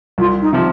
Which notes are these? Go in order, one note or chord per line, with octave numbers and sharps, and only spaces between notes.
C2 F4
D#4
C3 F3